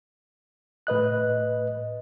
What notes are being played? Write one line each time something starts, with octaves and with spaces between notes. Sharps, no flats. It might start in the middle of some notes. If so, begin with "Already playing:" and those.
A2 B4 D#5 F#6